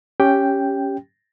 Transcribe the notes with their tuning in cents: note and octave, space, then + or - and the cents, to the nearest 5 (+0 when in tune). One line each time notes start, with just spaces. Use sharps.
C#4 +0 G4 +0 G5 +0